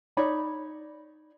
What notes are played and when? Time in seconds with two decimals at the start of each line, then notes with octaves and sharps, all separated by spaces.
0.17 D#4 C#5 D5 B5